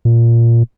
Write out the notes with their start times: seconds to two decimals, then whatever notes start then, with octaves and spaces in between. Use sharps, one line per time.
0.05 A#2